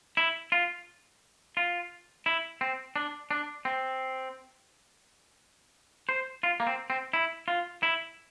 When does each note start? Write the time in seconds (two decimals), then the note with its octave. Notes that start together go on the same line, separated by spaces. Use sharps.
0.17 E4
0.52 F4
1.57 F4
2.26 E4
2.61 C4
2.96 D4
3.31 D4
3.65 C4
6.09 C5
6.43 F4
6.60 A#3
6.67 C4
6.90 C4
7.13 E4
7.48 F4
7.83 E4